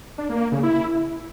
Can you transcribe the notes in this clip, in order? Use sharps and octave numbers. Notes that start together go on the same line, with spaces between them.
D4
A#3
A#3
C#3
E4